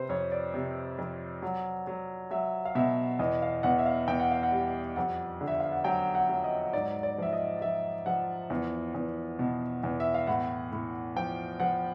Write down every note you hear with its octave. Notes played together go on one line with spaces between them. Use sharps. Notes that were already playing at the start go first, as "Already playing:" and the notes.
Already playing: C3 B4 C5
F2 C#5
D5
C3
F2
F#3
F#3
F#3 E5
F5
B2 E5
E2 D#5
F5
E2 F#5
E5
F5
E2 G5
F#5
F5
F#5
G3
F2 F#5
D3
E5
F5
F#5
F#3 G5
F#5
F#3
D#5
G#2 D5
D5
F3 E5
D#5
F3 E5
F3 F#5
E2
E2
B2
E2
E5
F5
A2 F#5
A2
F3 G5
F3 F#5